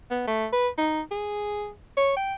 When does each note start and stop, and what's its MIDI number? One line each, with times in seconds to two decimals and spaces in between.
0.11 0.26 59
0.27 0.47 57
0.53 0.68 71
0.78 1.01 63
1.11 1.70 68
1.97 2.14 73
2.16 2.35 79